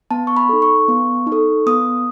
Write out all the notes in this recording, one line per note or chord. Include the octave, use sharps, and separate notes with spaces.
B3 A5
C#6
B5
D#4 A4
C#6
B3
D#4
A4
B3 D#6